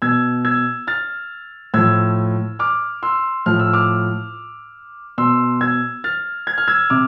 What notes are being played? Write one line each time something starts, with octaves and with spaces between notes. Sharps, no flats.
B2 E6 G#6
E6 G#6
F6 A6
A2 F3 E6 G#6
D6 F6
C6 E6
A2 F3 F6
E6
D6 F6
B2 C6 E6
E6 G#6
F6 A6
G#6
F6
E6 G#6
C3 D6 F6